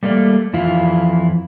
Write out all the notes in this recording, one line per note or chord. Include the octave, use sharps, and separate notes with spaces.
G3 A3 A#3 A#4 D5
F2 E3 E4 F4